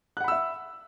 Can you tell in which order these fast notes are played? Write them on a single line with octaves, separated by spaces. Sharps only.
F#6 F#5 B5 E6 E5